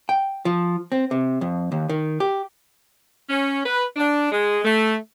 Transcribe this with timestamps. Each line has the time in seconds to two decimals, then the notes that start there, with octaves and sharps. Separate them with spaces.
0.09 G5
0.45 F3
0.92 C4
1.11 C3
1.41 F2
1.72 D#2
1.89 D#3
2.20 G4
3.29 C#4
3.65 B4
3.96 D4
4.31 G#3
4.65 A3